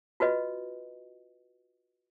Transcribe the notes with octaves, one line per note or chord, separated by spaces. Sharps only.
F4 F#4 B4 D#5